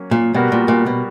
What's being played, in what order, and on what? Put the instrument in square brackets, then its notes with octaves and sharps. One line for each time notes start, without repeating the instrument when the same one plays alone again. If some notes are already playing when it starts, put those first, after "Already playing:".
Already playing: [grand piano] F#3 A#3 C#4
[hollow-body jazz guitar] A#2
[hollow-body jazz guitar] B2 [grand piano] G3 B3 F#4 A#4
[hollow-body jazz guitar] A#2
A#2
B2